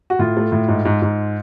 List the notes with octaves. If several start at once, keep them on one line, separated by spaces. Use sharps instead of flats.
F#4
A2 F4
A3
A2
G#2
G#2
G#2